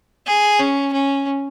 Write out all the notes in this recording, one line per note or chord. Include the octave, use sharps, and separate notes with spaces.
G#4
C#4
C#4